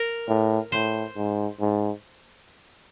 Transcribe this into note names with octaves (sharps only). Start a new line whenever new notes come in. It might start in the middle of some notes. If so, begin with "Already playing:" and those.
Already playing: A#4
A2
A2 C5
G#2
G#2